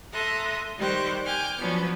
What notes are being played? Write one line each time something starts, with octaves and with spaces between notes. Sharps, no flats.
A4 E5 A#5 C6 D#6 F#6
D#3 G3 G4 C5 C#6 F#6
G5 G#5 D6 F6
F3 F#3 B3 C#4 D4